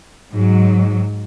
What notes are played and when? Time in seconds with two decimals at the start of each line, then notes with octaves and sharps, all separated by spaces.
0.34 G#2 F#3